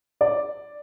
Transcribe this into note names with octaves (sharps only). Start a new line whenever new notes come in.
D5